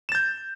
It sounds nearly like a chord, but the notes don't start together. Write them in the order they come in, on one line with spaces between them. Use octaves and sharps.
E7 A6 G6